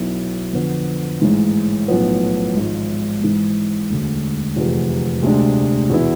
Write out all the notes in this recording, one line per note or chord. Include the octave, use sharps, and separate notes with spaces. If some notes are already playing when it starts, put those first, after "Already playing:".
Already playing: B1 B2 B3 E4
F2 D3 F3 B3
A1 G#2 E3 G#3
B1 A2 F3 B3
G#1 G#2 F3
G#1 G#2 E3
E1 D2 D3
F1 E2 C3 F3 B3
D2 C3 G#3 D4
E2 B2 B3 E4